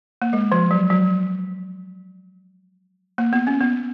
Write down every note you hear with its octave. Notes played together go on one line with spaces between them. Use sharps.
A#3
G#3
F3
F#3
F#3
A#3
B3
C#4
B3